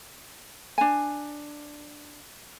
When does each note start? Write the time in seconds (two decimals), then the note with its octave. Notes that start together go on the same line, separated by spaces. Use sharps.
0.78 D4 G#5